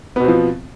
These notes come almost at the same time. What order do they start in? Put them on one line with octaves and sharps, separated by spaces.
B3 B2 C4 F3